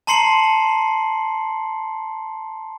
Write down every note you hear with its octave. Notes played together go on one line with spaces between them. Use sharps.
A5 A#5 C6 C7 C#7 F#7